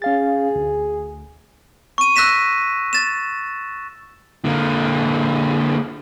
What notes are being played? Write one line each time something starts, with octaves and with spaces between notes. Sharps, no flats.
C#4 G#4 F5 A6
D2
C#6 D#7
E6 F#6 A#6 B6 E7
A6 E7
D3 A#3